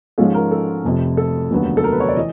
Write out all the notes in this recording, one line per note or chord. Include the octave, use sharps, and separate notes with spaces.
G#2 F3 G#3 C#4 F4 A4
A#4
A4
F1 F2 C3
A4
F1 D#2 D3 F#3 B3
A4
A#4
B4
C#5
D5
E3 D#5